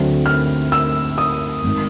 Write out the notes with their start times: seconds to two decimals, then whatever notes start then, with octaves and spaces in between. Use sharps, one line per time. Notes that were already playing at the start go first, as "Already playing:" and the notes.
Already playing: D2 D3 F#3 A3 C4
0.26 F6
0.72 E6
1.18 D#6
1.64 G#1 D#3